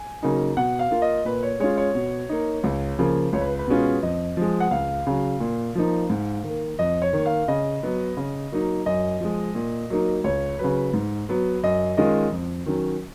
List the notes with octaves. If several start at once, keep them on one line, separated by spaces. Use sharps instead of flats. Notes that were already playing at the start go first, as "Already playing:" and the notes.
Already playing: G#5
C#3 F#3 A#3 D#4
B2 F#5
F5
A#3 F4
D#5
A#2 B4
C#5
G#3 C#4 F4 C#5
C#5
B2
A#3 D#4
C#2
C#3 F3 A#3
C#2 C#5
B4
B4
B2 G#3 C#4 F4
F2 D#5
F3 G#3
F#5
C#2 F5
C#3 F#3
A#2
F3 A#3 D#4
G#2
D#3
A#3
F2 D#5
C#5
D#3 A#3
F5
C#3 D#5
F#3 B3
C#3
F#3 A#3 D#4
F#2 D#5
F3 G#3
A#2
F#3 A#3 D#4
C#2 C#5
C#3 F#3 B4
G#2
F#3 B3
F#2 D#5
D#3 G#3 C#4 F4 D#5
F2
D#3 F#3 C#4